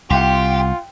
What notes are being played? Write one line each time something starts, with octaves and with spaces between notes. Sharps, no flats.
C2 F4 G4 F#5 G5 C6